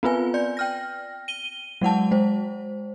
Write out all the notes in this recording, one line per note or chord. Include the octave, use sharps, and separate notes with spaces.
B3 C4 F4 B4 G#5
D5 G6
G5 F6 A#6
D#7 G7
F#3 G#3 F#5 A5
G#3 C5